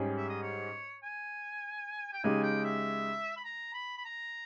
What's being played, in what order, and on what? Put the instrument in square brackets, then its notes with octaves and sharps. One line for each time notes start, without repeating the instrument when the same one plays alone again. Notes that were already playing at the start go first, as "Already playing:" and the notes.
Already playing: [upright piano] G#2 G3 C#4 G#4
[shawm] E5
D#5
C#5
G#5
G5
[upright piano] C#3 G#3 D#4 G4 [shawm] G#5
[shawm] G5
E5
B5
A#5
B5
B5
A#5